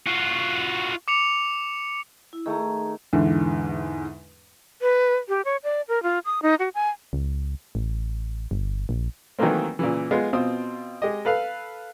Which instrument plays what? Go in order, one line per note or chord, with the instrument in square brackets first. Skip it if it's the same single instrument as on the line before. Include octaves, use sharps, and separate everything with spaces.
[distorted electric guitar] F4 F#4
[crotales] D6 C#7 F7
[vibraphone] E4
[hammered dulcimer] D#3 A3 [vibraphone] G#4 A#5
[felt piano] E2 G#2 D3 E3
[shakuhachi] B4
G4
C#5
D5
A#4
F4
D#6
D#4
F#4
G#5
[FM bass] C#2
A1
G1
A#1
[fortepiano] D#3 E3 F#3 A3 A#3 C4
A#2 C#3 E3
G#3 B3 F4 F5
B2 C4 F4 D#6
G#3 G4 D#5
A4 B4 F5